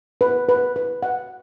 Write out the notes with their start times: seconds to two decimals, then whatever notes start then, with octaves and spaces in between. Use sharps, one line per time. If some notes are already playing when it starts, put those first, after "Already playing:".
0.21 B4
0.49 B4
0.76 B4
1.03 F#5